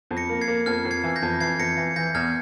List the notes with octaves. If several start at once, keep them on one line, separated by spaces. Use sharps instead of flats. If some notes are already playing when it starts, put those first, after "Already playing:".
F2
A#6 C#7
A#3
G#6 C7
A#3
F2 F6 G#6
F2
G#6 C7
E3
G6 A#6
F2
E3 G#6 C7
F2 A#6 C#7
E3
E3 G6 A#6
E2 F6 G#6